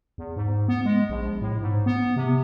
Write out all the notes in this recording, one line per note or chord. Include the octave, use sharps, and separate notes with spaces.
E2
G#2
B3
G#3
A#1
A2
G#2
B3
C3